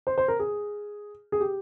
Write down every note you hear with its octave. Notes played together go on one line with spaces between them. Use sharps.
C5
C5
A#4
G#4
G#4
G4